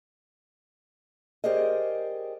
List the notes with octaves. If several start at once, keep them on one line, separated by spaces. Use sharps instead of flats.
G4 G#4 A#4 C5 D5 D#5